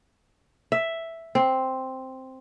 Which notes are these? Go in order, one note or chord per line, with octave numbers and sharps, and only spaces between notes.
E5
C4